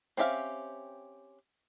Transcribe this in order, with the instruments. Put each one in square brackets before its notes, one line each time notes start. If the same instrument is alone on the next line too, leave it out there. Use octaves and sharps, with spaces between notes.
[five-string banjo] C4 C#4 G4 E5 F5